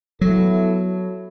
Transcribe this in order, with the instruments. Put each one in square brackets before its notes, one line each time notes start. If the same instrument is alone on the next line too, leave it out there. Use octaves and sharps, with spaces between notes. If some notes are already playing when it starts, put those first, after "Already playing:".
[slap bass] F#3 [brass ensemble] B3 E4 A4